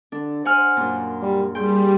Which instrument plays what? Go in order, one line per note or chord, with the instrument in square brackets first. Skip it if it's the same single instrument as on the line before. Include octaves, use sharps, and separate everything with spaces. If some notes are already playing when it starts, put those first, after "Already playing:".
[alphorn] D3 [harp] D4
[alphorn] C5 [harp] F#5 G#5 F6
[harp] F#2 A#2
[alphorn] G3
[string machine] G3 [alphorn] G#4 [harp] G5 C6 G6